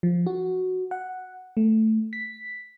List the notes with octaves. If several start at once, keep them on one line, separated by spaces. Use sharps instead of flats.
F3
F#4
F#5
A3
B6